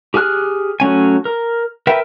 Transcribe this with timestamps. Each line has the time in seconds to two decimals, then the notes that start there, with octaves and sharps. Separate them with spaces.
0.14 G4 G#4 G#5 F6 F#6
0.80 F#3 A3 C#4 G#5
1.25 A#4
1.87 A#4 B4 E5 G5